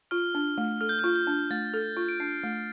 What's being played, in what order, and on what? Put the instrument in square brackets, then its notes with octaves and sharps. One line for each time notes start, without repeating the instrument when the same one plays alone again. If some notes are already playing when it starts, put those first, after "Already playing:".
[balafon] F4 [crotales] F6
[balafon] D4
A3
[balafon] A4 [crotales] F6
[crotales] G6
[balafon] F4 [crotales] F6
[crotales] G6
[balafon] D4
[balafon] A3 [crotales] A6
[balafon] A4
F4
[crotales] D7
[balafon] D4 [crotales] C7
[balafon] A3